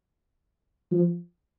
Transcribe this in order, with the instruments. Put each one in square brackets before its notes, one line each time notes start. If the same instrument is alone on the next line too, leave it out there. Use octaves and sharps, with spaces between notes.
[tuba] F3